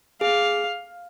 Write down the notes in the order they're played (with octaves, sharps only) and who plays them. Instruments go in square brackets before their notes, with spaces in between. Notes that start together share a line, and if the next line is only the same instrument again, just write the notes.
[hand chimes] G#4 [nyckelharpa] F5